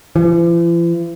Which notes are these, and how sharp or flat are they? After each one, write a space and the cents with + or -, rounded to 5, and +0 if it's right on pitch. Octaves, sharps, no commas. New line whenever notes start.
E3 +45